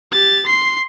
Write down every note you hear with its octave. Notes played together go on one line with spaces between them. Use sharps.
G4 A6
C6 C7